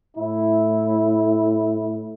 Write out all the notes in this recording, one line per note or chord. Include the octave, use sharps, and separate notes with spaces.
A2 E4